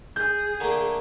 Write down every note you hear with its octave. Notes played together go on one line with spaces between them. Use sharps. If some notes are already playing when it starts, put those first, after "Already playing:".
G#4 G6
D3 A3 A#3